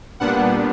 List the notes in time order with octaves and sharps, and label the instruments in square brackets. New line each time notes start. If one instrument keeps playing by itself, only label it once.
[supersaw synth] A#2 G3 B3 D4 F#5